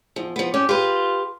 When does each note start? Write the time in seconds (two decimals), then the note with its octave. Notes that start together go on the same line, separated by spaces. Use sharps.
0.16 E2 F3
0.36 F3 B3
0.54 C#4 G4
0.69 F4 G4 B4